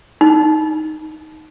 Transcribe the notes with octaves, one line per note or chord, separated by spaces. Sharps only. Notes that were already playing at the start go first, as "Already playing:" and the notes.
D#4